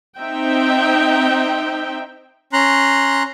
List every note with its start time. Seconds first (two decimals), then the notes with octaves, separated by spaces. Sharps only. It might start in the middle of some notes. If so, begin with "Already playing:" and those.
0.18 C4 D#4 E5 G5
2.53 C#4 A#5 C6 F#6